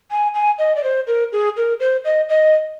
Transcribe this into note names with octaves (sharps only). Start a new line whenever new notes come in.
G#5
G#5
D#5
D5
C5
A#4
G#4
A#4
C5
D#5
D#5